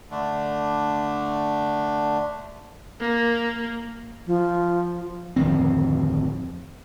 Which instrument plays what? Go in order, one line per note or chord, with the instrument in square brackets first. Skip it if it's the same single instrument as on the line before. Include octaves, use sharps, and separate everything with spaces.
[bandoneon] D3 A3 D4
[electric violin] A#3
[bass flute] F3
[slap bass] D1 F2 D#3 C4